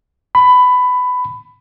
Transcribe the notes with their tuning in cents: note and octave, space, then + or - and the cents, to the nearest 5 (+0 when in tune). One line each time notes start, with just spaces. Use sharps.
B5 +15